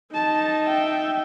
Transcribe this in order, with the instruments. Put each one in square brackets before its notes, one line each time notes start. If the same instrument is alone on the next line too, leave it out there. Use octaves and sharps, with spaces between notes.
[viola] D#4 [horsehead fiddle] A5
[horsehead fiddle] E5 G5